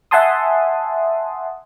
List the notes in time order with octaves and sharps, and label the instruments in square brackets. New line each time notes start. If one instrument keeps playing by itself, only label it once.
[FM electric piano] E5 F#5 G#5 A5 C6 D#6